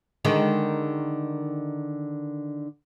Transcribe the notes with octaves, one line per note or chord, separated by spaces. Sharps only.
D3 D#3 G#3